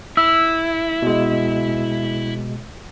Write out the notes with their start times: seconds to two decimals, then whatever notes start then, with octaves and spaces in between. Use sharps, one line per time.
0.17 E4 E6
1.02 B2 G#3